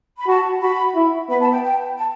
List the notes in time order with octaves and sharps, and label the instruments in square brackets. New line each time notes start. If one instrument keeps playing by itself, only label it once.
[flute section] B5
[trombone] F#4 [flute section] A5
[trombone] F#4 [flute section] B5
[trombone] E4
[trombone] B3 [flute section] B5
[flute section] A5
G5
G5
A5